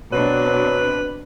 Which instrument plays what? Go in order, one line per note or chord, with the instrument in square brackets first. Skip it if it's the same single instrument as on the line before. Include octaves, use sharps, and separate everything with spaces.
[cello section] B2 C4 D4 [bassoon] F#3 [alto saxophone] B4